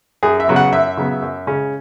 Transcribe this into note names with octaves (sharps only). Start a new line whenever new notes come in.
F#2 G#4
E5
C#3 F#3 B3
F#5
F#2 E5
C#3 F#3 B3
F#2
C#3 G#3 C#4